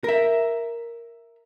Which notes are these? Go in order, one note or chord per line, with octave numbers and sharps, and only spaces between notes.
A#4 E5